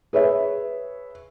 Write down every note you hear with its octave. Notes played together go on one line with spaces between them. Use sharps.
G#4 B4 C#5 E5